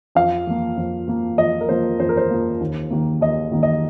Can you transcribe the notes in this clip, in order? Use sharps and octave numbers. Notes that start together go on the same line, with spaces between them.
F2 F5
F3 A#3
F2
F3 A#3
F2 D#5
A#4
F3 A#3 C5
F2 C5
A#4
C5
F3 A#3
D#2
D#3 A#3
D#2 D#5
D#3 A#3
D#5